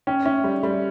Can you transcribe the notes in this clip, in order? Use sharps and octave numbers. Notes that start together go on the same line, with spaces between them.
C#4 G5
C#4 E5
G3 E5
G3 E5